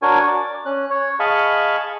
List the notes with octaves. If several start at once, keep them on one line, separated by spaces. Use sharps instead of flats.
D4 F#4 A#4 C#5 G#5
D5
C#4 F#6
C#5
G#4 D#5 F5 A5 B5 C#6